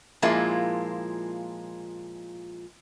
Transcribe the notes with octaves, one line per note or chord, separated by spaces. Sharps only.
A#2 F3 G#3 A#3 E4 F4